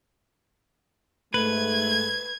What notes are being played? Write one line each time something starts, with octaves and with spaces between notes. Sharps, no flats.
G#2 A3 B4 G#6